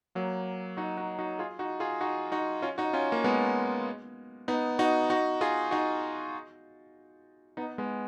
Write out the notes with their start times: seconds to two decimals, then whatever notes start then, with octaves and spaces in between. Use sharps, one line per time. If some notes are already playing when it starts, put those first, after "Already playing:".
0.15 F#3 A#3
0.77 D#4 F#4
0.97 D#4 F#4
1.19 D#4 F#4
1.39 F4 G#4
1.59 D#4 F#4
1.80 F4 G#4
2.01 D#4 F#4
2.32 D#4 F#4
2.62 C#4 F4
2.78 D#4 F#4
2.93 C#4 F4
3.12 A#3
3.24 G#3 B3
4.48 B3 D#4
4.79 D#4 F#4
5.10 D#4 F#4
5.41 F4 G#4
5.71 D#4 F#4
7.57 B3 D#4
7.78 G#3 B3